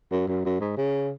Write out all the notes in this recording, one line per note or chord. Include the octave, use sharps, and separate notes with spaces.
F#2
F#2
F#2
G#2
C#3